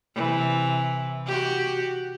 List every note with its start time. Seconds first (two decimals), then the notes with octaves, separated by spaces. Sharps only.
0.15 C3 E3
1.26 F#4 G4